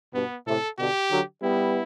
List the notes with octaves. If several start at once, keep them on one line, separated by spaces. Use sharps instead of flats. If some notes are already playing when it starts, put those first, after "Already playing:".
G2 B2 B3
A2 C3 A4
B2 D3 G4
D3 F#3
G3 B3 E4